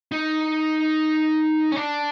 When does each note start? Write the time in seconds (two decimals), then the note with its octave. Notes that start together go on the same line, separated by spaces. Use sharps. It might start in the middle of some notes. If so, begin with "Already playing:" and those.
0.12 D#4
1.72 C#4
1.76 D4